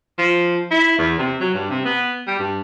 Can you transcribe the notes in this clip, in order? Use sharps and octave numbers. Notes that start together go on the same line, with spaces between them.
F3
E4
E2
C3
F#3
G2
C3
B3
G3
G2